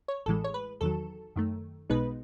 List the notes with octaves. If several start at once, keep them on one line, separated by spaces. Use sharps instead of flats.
C#5
A1 A2 E3 G#3 A4
C#5
B4
E2 D#3 F#3 A4
F#2 D#3 A3
B1 B2 G#3 B3 D#4 B4